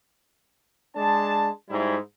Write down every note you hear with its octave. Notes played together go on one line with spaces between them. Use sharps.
G#3 D4 A5
G#2 G3 D#4 E4